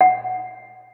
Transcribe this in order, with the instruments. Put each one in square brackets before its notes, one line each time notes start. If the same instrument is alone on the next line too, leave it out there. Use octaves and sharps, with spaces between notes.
[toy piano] F#5